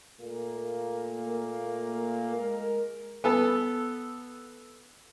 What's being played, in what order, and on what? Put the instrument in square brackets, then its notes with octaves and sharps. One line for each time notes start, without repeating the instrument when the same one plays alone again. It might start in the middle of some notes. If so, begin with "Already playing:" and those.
[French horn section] A#2 A3 A#3
G#3 A#4
[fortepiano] B3 A4